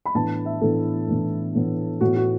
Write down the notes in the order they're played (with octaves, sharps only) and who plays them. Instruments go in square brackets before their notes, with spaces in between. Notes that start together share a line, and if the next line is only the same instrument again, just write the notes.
[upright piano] B5
A2 E3 B3 D4 A5
E5
A2 E3 B3 D4 A4
A2 E3 B3 D4
A2 E3 B3 D4
A2 E3 B3 F#4
F#4